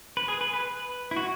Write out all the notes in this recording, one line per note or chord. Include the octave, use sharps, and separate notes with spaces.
B4
G#4
B4
B4
B4
E4
F#4